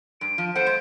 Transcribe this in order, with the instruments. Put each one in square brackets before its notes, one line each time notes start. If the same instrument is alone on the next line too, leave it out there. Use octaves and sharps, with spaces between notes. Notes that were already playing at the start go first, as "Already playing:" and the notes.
[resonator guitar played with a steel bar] G2 [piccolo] D7
[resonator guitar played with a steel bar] F3
[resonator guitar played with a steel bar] B3 A4 F#5 [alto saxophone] C5 [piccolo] D7
[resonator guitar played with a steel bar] G#3